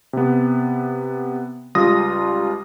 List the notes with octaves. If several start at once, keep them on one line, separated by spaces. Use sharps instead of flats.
C3 B3
C#2 G3 F4 D#6 A#6